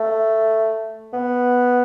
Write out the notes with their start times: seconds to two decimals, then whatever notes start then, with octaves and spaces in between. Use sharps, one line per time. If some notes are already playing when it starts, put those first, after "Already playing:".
Already playing: A3
1.13 B3